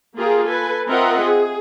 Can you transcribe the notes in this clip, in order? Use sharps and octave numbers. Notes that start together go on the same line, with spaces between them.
A#3 F4 G4 G#4 A#4
A4 B4 G#5
C4 F4 A#4 D#5 E5 F#5
G#4